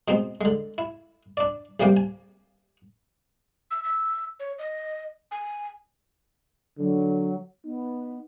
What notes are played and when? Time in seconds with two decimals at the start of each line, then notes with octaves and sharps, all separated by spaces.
0.08 B2 G#3 C4 D#4
0.41 D3 G#3
0.78 E4
1.37 D4 D5
1.80 A#1 C3 G3 A#3 G5
1.97 G#5
3.71 E6
3.84 E6
4.40 C#5
4.59 D#5
5.31 G#5
6.78 D3 F#3
7.65 B3 D#4